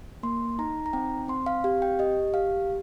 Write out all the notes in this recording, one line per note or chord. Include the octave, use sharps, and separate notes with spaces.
A#3 C6
D#4 A#5
A#5
C4 G5
C4 C6
F5
G4 F5
G5
G4 D#5
G4 F5